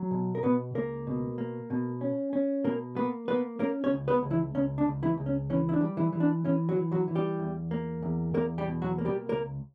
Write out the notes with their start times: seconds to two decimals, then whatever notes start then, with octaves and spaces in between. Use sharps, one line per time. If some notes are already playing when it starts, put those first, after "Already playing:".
Already playing: F#3
0.11 B2
0.35 A#4
0.43 B2 B3 B4
0.75 C#2 A#3 A#4
1.07 B2
1.38 A#3
1.70 B2
2.01 C#4
2.33 C#4
2.64 B2 A#3 A#4
2.96 A#3 B3 B4
3.28 A#3 B3 B4
3.59 A#3 C#4 A#4
3.84 C#4 C#5
3.91 C#2
4.08 B3 B4
4.23 C#2
4.30 E3 E4
4.55 C#2 C#4
4.78 D4
4.86 C#2
5.03 E3 E4
5.18 C#2
5.26 C#4
5.50 E3 C#4
5.69 E4
5.73 D4
5.81 G3
5.97 E3 E4
6.13 E3
6.20 D4
6.45 E3 C#4
6.69 F#3 F#4
6.76 E3
6.92 F#3 F#4
7.08 E3
7.15 G3 G4
7.40 E2
7.71 A#3
8.02 E2
8.34 E2 A#3 A#4
8.58 G3 G4
8.66 B2
8.82 F#3 F#4
8.98 A#3
9.05 G3 G4
9.29 C#2 A#3 A#4